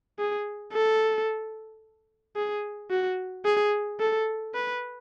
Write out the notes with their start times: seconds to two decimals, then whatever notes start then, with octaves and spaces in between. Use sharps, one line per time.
0.19 G#4
0.73 A4
2.36 G#4
2.90 F#4
3.45 G#4
4.00 A4
4.55 B4